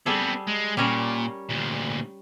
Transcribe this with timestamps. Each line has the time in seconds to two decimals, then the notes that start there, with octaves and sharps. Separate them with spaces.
0.06 G3 B3 C4 G#4 A4
0.47 G#3
0.77 A#2 G3 C#4 A#4
1.49 D2 A#2